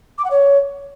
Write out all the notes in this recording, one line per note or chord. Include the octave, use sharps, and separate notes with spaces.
D6
F#5
C#5